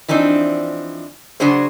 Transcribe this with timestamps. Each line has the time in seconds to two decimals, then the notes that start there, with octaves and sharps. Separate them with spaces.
0.08 E3 F3 C4 D4 D#4
1.40 C#3 F#3 D4 F#4 G#4 C5